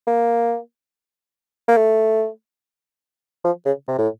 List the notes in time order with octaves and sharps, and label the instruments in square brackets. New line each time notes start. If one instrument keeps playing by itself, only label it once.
[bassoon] A#3
A#3
A3
F3
C#3
C3
A2